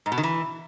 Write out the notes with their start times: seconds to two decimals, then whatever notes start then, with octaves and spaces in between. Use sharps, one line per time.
0.06 G#2
0.12 B2
0.18 D#3
0.23 E3